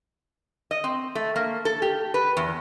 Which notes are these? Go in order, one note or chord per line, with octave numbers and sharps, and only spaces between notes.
D#5
C4
A3
A#3
A4
G4
B4
E2